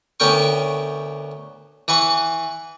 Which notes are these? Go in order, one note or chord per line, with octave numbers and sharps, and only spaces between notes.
D2 B3 C#4 A#4 G5 C#6
E3 B4 F#5 C#6